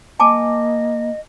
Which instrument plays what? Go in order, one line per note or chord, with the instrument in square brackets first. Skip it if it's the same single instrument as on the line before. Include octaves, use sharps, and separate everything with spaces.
[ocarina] A#3 [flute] D#5 [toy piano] G#5 A5 D6